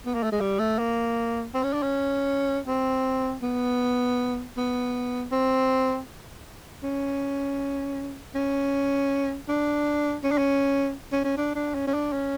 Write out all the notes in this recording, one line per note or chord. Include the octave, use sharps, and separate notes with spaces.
B3
A#3
A3
G#3
G3
A3
A#3
C4
C#4
D4
C#4
C4
B3
B3
C4
C#4
C#4
D4
C#4
D4
C#4
C#4
C#4
D4
D4
C#4
C#4
D4
C#4